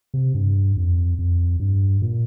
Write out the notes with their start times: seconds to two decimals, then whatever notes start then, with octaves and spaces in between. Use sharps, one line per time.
0.14 C3
0.34 G2
0.76 F2
1.19 F2
1.60 G2
2.02 A#2